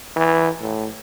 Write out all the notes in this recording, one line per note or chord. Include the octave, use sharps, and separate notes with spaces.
E3
A2